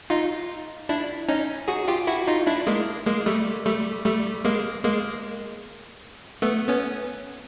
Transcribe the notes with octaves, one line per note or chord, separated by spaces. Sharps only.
D#4 F4
D4 E4
C#4 D#4
F#4 G#4
F4 G4
E4 F#4
D#4 F4
D4 E4
G#3 A#3
G#3 A#3
G3 A3
G3 A3
G3 A3
G#3 A#3
G#3 A#3
A3 B3
B3 C#4